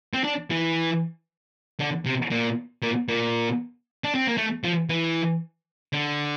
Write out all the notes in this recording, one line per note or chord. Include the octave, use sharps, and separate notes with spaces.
C4
D4
E3
D3
C3
A#2
A#2
A#2
D4
C4
A#3
A3
F3
E3
D3